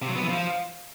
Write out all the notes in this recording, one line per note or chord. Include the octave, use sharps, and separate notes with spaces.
C3
F#3
B3
E3
F3